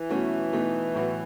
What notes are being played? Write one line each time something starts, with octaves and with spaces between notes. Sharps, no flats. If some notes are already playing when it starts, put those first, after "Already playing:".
Already playing: E3
B2 F#3 A3 C#4 F#4
B2 A3 D#4
A2 F#3 B3 F#4